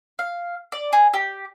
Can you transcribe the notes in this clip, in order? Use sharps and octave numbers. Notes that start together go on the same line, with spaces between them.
F5
D5
G#4
G4